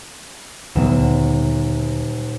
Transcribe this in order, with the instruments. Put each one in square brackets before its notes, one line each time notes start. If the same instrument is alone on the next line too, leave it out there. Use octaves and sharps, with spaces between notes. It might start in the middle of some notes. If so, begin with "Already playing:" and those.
[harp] D#1 F#3 E7 [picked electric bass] D2 C#3 B3